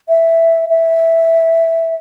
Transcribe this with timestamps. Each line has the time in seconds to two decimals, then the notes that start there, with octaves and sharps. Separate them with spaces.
0.09 E5
0.69 E5